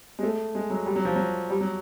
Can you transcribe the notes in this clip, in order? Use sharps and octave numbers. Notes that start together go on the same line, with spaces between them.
G#3
A3
G#3
F#3
G3
F#3
F3
F#3
G3
F#3